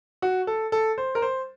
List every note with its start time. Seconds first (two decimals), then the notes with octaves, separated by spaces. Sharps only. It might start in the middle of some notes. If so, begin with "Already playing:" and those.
0.22 F#4
0.47 A4
0.72 A4
0.98 C5
1.15 A#4
1.22 C5